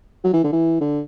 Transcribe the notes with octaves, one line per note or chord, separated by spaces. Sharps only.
F#3
E3
D3
E3
D3